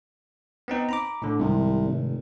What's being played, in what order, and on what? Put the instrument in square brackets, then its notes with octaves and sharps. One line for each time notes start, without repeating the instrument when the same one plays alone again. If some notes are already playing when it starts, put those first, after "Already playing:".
[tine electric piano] B3 C4 D#4
A#5 B5 D6
A2 D3
[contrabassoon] C2 [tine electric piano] G#2 C3 D#3
[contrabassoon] F1